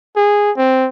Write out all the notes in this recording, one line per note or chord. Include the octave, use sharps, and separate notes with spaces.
G#4
C4